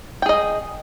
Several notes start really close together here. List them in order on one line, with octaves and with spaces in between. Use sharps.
G5 G#4 D#5